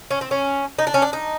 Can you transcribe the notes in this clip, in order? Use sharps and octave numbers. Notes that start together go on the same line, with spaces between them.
C#4
C4
C#4
D#4
D4
C#4
D4
D#4